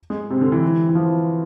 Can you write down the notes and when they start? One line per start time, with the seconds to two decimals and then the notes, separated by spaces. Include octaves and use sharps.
0.10 G#3
0.30 C3
0.41 D3
0.52 E3
0.89 E3
0.95 F3